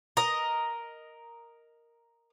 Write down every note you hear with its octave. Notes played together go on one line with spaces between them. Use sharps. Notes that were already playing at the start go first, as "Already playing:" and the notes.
A#4 D#5